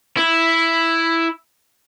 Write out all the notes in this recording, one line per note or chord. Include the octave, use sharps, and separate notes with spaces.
E4